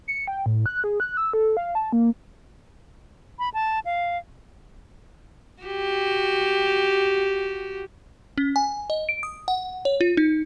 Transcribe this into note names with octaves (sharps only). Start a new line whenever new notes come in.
C#7
G5
A2
F#6
G#4
F#6
E6
A4
F5
A5
A#3
B5
A5
F5
F#4 G4
C#4
G#5
D#5
D7
D#6
F#5
C#5
F4
D#4